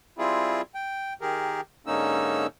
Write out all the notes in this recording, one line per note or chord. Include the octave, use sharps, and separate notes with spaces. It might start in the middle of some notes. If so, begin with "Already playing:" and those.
G3 C4 E4 F4 G#4
G5
D#3 G4 G#4 A#4
G#2 D3 A#3 C#4 D#4 E6